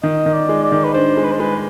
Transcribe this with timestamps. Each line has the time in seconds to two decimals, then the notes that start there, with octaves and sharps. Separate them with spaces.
0.03 D#3 D#5
0.26 D#3
0.33 D5
0.49 G#3
0.63 D5
0.72 D#3
0.84 B4
0.94 D4 C5
1.17 G#3
1.24 B4
1.32 C5
1.40 G#3 B4